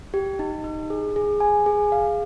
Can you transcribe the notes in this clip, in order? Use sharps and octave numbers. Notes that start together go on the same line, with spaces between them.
G4
D#4
D#4
G#4
G#4
G#5
G#4
F5